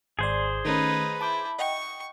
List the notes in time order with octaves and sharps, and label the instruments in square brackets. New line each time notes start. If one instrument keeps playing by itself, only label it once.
[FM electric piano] G#1 D5 [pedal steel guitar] G#4 C5
[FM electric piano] D#3 A3 C#4 [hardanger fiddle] D#4 B4
[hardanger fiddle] E4 [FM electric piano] A5 D6 G6
[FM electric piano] D#5 F#5 G5 [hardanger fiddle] C#6